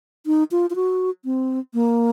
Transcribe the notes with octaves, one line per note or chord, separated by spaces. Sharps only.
D#4
F4
F4
F#4
C4
A#3